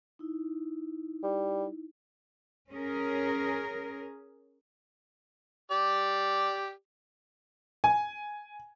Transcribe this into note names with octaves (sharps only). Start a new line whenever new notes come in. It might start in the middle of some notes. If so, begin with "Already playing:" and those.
D#4 E4
G3
C#4 G#4 A#4
G4 D5
G#5